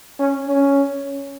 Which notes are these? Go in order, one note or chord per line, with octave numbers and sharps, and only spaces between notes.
C#4
C#4